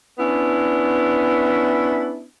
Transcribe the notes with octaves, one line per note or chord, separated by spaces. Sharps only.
B3 C#4 D4 E4